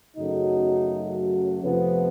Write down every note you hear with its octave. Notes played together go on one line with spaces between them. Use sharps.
F#2 C#3 F#3 A3 D#4
F2 C3 F3 A3 B3